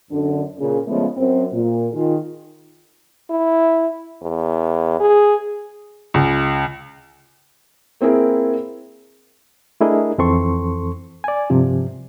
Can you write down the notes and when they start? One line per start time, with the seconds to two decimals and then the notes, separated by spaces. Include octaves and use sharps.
0.10 F#2 D3
0.59 A#2 C#3
0.88 C#3 F3 G#3 A3 B3 C#4
1.17 F#2 C4
1.53 A#2
1.93 D#3 F4 G#4
3.30 E4
4.22 E2
5.00 G#4
6.14 C#2
8.01 A#3 C4 E4 G#4 A#4
9.81 A3 D4 E4 G#4 A#4 D#5
10.18 F2 E3 C4 A4 C6 C#6
11.24 D5 G#5
11.50 G2 C3 F3